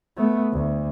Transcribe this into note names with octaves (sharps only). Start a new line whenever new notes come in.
A3 B3
D2